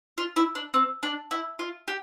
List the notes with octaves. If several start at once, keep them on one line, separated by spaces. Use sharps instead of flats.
F4
E4
D4
C4
D4
E4
F4
G4